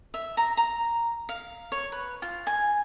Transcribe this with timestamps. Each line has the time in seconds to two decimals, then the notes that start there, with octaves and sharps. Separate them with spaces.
0.14 E5
0.37 A#5
0.57 A#5
1.29 F5
1.72 C#5
1.92 B4
2.22 F4
2.47 G#5